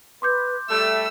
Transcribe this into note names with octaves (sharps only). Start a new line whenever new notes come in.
B4 C6 D6 G6
G3 A3 E5 E6